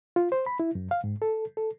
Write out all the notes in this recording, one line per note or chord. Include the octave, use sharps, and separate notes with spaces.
F4
C5
B5
E4
F#2
F5
G#2
A4
A4